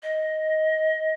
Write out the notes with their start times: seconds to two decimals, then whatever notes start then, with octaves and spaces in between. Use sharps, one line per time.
0.03 D#5